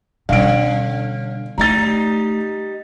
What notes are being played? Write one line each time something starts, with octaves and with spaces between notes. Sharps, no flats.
B2 D3 G3 C#4 F5 D7
G3 A3 D#4 A#5 A6